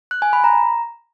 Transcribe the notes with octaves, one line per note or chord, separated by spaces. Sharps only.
F#6
G#5
B5
A#5